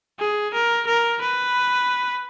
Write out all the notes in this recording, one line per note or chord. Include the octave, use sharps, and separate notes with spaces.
G#4
A#4
A#4
B4